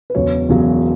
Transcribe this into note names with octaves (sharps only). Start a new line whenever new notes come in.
B4
E1 E2 C#3 F#3 C#5
E1 E2 C#3 F#3